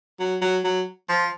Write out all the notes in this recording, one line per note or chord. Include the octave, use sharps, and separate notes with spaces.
F#3
F#3
F#3
F3